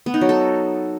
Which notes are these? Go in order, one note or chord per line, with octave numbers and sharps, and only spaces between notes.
B3
D#4
F#3
A4